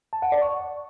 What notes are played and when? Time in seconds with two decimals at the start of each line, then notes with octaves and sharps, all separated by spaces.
0.13 A5
0.22 F#5
0.32 D5
0.42 C#6